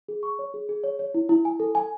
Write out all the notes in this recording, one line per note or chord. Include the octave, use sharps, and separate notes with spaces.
G#4
C#6
C#5
G#4
G#4
C#5
C#5
E4
E4
G#5
A4
G#5